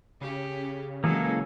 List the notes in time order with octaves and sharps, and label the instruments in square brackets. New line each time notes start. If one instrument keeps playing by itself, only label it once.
[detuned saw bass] C#3 [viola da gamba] C#4 G4
[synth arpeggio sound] E3 [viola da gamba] F#3 G#3 C#4 [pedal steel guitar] A#3 G#4 A4